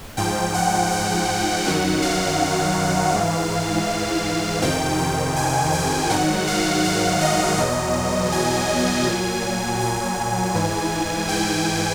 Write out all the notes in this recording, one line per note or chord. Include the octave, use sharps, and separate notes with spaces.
G#2 F3 G5
F#5
G5
F#2 D#3 F#3 F#5
F5
G#2 E3
F2 C3 D#3 G5
G5
G#5
G5
G#2 D#3 F#3 F#5
F5
F5
D#5
E2 B2 F#3 D#5
G#5
A#2 F#3
G#5
G#2 E3
G5